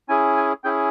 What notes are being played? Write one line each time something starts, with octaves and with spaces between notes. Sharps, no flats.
C#4 E4 G#4 G#5
G#5
C#4 E4 G#4 G5